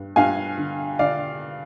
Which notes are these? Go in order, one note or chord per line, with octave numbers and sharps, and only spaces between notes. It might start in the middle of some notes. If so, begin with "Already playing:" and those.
Already playing: G2
G2 F5 G#5
D3
D3 D5 F5